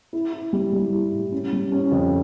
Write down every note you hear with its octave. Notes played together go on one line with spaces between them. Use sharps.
E4
E4
G3
G3
E4
A2
C#4
G3
C#4
F2